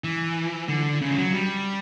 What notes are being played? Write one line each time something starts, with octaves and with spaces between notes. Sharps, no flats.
E3
D3
C#3
F3
F#3
G3